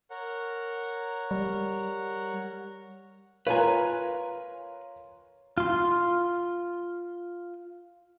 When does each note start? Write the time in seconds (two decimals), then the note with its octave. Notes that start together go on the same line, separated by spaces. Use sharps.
0.10 A#4 C#5 F#5
1.31 G3
3.47 F4 A#4 B4 C#5 F5 G#5 A#5
5.58 F4 C6